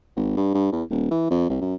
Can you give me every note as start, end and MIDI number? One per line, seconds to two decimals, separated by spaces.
0.16 0.33 32
0.37 0.50 43
0.54 0.70 43
0.72 0.83 40
0.90 1.10 27
1.11 1.28 52
1.30 1.48 41
1.49 1.57 36
1.61 1.75 42